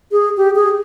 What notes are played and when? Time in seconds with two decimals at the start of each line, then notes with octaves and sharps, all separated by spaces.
0.12 G#4
0.37 G4
0.56 G#4